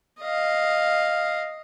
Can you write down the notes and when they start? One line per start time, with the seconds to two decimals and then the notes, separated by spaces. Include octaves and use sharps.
0.21 D#5 F5